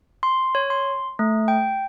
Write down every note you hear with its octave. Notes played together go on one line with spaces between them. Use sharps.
C6
C#5
C6
A3
G5